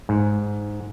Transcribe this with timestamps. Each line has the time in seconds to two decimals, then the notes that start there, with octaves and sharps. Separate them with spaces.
0.09 G#2